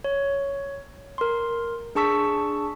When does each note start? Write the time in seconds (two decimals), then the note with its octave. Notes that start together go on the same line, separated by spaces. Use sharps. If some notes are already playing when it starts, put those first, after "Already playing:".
0.04 C#5
1.18 A#4 C6
1.95 D4 G#4 A5 C#6 E6 B6